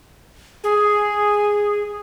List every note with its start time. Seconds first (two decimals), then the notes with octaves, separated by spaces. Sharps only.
0.64 G#4